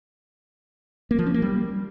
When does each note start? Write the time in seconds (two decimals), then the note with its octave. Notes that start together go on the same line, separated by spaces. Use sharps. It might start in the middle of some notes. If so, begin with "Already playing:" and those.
1.11 A#3
1.19 F3
1.26 C#4
1.34 A#3
1.42 G3